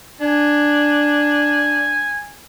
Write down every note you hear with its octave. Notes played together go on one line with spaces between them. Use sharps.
D4 G#5